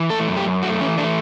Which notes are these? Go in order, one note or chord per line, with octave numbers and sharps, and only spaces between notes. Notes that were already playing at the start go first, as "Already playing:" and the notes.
Already playing: E3
A3 A4
F#2
G4
F#2
A3 F#4
E3 C#4
A3 D4